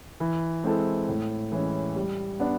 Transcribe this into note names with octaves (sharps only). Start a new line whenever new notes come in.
E3
G#3 C4 E4 A4
A2
E3 G#3 C#4 E4
G3
B3 D4